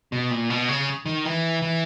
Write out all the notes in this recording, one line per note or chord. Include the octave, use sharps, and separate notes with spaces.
B2
A#2
B2
C#3
D#3
E3
E3